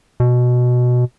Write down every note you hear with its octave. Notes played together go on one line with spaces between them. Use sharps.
B2